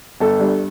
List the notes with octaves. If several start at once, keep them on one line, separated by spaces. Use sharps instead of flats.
G1 A4
G2